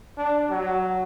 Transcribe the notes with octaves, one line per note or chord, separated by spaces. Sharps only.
D4
F#3